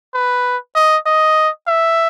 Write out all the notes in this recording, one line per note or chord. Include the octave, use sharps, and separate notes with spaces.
B4
D#5
D#5
E5